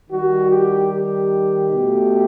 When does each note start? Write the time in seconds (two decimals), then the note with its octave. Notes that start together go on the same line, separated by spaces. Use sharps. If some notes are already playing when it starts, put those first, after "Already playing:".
0.10 D#3 G3 F#4
0.51 G4
0.91 G4
1.72 B2 A3